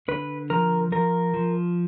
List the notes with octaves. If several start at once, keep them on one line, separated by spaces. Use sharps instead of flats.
D3 B4
F3 A#4
F3 A#4
F3